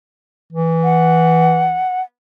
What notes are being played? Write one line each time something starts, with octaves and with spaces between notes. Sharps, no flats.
E3
F#5